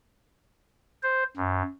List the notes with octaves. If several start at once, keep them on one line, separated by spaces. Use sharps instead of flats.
C5
F#2